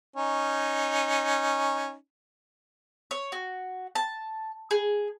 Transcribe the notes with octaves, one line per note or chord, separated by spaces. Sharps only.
C#4 D#4
C#5
F#4
A5
G#4